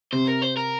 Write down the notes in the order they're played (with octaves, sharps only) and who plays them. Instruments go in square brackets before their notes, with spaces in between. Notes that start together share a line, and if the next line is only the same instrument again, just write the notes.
[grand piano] C3 [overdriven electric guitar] C5
[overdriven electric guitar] A#4
C5
A#4